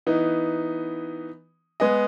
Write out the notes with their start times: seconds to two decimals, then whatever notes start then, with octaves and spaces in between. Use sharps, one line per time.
0.07 E3 B3 D#4
1.80 G#3 B3 G#4 D#5